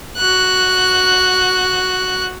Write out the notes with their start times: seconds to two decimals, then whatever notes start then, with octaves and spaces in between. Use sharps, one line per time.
0.17 F#4 F#6